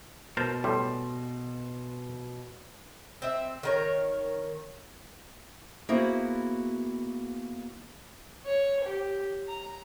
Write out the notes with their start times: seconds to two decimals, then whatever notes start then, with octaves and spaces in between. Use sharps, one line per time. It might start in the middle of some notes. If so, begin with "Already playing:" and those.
0.37 B2 A#4 C5 A5 A6
0.64 A2 G3 C6
3.22 C4 E5
3.63 D#3 A#4 C#5
5.89 A#3 B3 E4 F#4 G#4 C5
8.45 C#5
8.84 G4
9.47 A#5